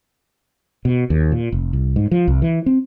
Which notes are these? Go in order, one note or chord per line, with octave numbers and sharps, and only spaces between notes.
B2
D#2
A#2
F1
C2
G#2
F3
C2
E3
C4